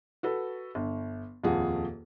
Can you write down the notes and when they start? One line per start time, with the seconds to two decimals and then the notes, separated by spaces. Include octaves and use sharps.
0.23 F#4 A4 B4
0.75 G1
1.44 D#1 F2 F4 G#4 F#5